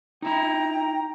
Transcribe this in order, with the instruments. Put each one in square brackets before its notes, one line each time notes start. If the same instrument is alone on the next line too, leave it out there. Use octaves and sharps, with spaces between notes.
[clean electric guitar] D#4 E4 B5 [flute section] G5 A#5